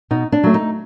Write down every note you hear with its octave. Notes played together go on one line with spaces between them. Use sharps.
B2 D#4
D4
F#3 A3
D#4